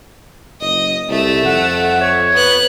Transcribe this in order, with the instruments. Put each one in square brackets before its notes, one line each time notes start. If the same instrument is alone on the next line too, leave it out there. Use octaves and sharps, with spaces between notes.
[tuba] F#1 [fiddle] D#5
[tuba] C2 [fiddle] A3 E5
[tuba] F2 [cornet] F#5
[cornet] C#5
[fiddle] B3 F#6